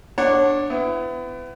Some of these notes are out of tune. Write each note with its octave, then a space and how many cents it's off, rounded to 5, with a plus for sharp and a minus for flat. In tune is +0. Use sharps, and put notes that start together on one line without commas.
D4 +0 C#5 -25 F#5 +0
B3 +35 E4 +25